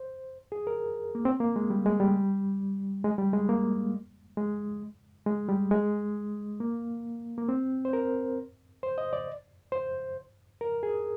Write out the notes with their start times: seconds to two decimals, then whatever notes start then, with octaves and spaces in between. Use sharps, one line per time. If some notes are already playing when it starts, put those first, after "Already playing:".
Already playing: C5
0.52 G#4
0.67 A#4
1.15 A#3
1.25 C4
1.40 A#3
1.56 G#3
1.70 G3
1.86 G#3
2.00 G3
3.04 G#3
3.18 G3
3.33 G#3
3.49 A#3
4.37 G#3
5.26 G#3
5.48 G3
5.71 G#3
6.60 A#3
7.38 A#3
7.49 C4
7.85 C5
7.93 A#4
8.83 C5
8.98 D#5
9.13 D5
9.72 C5
10.61 A#4
10.83 G#4